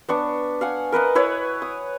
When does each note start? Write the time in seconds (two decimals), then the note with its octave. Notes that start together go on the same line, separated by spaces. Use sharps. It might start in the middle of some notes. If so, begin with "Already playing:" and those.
0.08 B3 D4 C#6
0.61 F5 F#5 G#5
0.92 A#4 B4 D#5 F#5
1.15 E4 B4 C#5 F#5
1.62 D#6